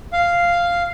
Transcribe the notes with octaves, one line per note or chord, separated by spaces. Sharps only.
F5